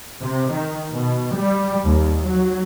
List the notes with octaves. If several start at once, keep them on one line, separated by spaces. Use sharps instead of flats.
C3
D#3
B2
G3
D#2
F#3